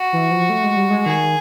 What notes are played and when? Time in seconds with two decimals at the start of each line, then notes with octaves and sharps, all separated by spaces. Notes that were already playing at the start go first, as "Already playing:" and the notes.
Already playing: F#4
0.13 E3
0.31 F3
0.50 A3
0.64 G#3
0.76 G3
0.90 G#3
1.05 D#3 G#4